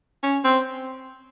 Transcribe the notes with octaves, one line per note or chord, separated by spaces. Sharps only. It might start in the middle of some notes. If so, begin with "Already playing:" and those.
C#4
C4